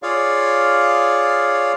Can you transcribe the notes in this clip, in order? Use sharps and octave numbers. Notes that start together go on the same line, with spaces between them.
F4 G#4 C#5 D5 F5